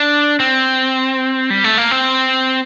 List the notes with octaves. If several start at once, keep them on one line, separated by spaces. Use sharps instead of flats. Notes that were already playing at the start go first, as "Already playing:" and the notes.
Already playing: D4
C4
G3
A3
A#3
C4